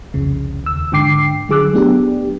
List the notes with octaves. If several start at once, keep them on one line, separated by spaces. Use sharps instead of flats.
C2 F2 C#3
D#2 E6
G#2 D3 G5 D6 C7
D3 F#3 G#4 D6 E6 F#6
F#3 A3 B3 D4 G4